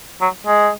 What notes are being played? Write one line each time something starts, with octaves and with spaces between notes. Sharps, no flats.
F#3
G#3